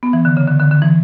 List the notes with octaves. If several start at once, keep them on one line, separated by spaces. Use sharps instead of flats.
B3
E3
D3
C#3
D3
D3
D3
E3